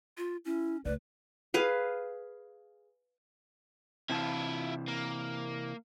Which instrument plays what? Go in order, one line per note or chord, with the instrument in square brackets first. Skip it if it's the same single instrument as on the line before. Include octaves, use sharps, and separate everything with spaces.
[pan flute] F4
[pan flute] C#4 [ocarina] E4
[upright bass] C#2 A3 [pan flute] B4 [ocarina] D5
[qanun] G#4 B4 F5
[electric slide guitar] C3 E3 A5 [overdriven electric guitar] E4 F4
[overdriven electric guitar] A#3